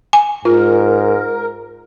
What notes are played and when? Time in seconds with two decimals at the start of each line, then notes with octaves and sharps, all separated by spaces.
0.13 G#5
0.45 G#2 F4 A#4